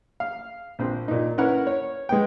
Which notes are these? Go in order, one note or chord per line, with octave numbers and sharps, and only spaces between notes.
F5
A#1 C4
A#2 D#4
C#4 E4 A#4 B4 F#5
C#5
G#3 B3 G5